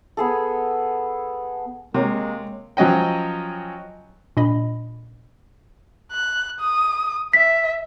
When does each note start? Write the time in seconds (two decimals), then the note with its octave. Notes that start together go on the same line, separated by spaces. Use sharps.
0.17 B3 G#4 A4
1.94 C3 G#3 A#3 A#4 C#5
2.77 F3 F#3 C#4 D#5 G5
4.37 A#2 D4 D#5 B5
6.12 F#6
6.60 D#6
7.33 E5 B6